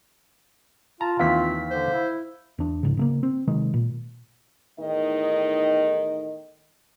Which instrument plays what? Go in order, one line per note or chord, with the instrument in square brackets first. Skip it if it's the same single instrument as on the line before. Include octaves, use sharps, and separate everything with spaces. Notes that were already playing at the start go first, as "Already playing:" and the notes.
[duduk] F4 [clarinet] A5 [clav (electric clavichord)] A#5
[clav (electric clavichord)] D#2 E3 [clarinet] C4 [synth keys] F5 B6
[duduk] D3 [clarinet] C5
[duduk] E4
[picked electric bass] E2 D4
C#2 G#2 C#3
C#3 A3 A#3
C4
C3 D#3 F#3 G#3
A#2
[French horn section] E2 A2 D#3 D#4 D#5